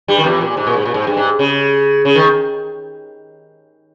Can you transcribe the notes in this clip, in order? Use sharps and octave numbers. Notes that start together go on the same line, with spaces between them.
G2 G3
D#3
E2 E3
A#2
G#2
A#2
G#2
A#2
G#2
G2
G#2
C#3
C#3
D#3